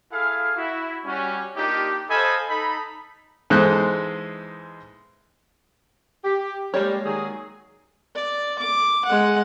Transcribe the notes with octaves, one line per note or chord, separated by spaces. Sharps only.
E4 G#4 A4 F5
E4 F#4
G3 C#4 F#4
A#3 D4 D#4 F4 G4
A4 C5 D#5 F5 G#5 B5
D#4 A4 B5
E2 G#2 G#3 A4 C5 F#6
G4
G3 G#3 A#3 C#5
D#3 F#3 G#4
D5
D6
G#3 F#5